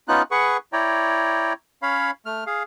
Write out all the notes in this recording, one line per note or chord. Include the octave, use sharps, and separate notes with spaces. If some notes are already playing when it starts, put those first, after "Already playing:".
B3 C#4 D#4 F4 F#6
G#4 B4 F#5 C#6
E4 C#5 D5 G5 A#5
C#4 C#5 F5 B5
A3 F6
G#4 F5